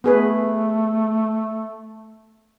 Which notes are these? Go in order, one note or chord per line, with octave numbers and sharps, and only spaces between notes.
A3 B3 G#4 B4